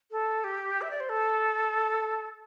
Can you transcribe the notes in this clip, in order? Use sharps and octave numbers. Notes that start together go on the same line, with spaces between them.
A4
G4
E5
D5
C5
A4